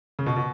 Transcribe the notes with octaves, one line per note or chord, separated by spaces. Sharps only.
C#3
B2
B2